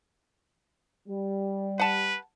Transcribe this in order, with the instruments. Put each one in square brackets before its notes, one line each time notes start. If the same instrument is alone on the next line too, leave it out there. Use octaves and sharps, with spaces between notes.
[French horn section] G3
[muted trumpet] B4 [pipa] F#5 A5